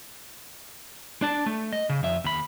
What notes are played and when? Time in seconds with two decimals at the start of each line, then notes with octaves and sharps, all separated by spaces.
1.22 D4 A5
1.46 A3
1.73 D#5
1.89 C#3
2.03 F2 E5
2.24 D#2 B5